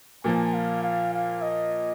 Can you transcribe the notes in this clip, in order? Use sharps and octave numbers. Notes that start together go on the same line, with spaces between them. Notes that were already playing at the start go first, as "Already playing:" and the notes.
A#2 F3 A#3 G#5
F5
F5
F5
D#5